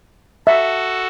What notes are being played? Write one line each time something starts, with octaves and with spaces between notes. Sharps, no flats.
F#4 A4 E5